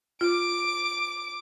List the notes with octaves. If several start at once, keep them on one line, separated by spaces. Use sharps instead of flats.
F4 D6 D7